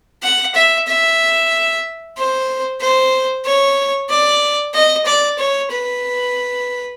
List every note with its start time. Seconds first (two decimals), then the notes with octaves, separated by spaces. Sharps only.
0.23 F#5
0.55 E5
0.87 E5
2.17 C5
2.81 C5
3.45 C#5
4.10 D5
4.74 D#5
5.06 D5
5.39 C#5
5.71 B4